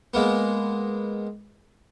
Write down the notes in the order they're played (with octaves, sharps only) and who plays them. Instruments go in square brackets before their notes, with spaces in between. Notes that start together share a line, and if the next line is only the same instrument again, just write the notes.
[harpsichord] G#3 A#3 B3